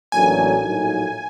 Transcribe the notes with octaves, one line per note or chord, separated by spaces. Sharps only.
A1 A2 F#3 A#3 D4 G#5
A#1 A2 F#3 A#3 D#4